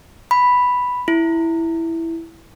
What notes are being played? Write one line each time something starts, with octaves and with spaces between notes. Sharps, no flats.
B5
E4